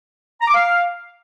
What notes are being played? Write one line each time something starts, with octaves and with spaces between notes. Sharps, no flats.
A#5
D6
F5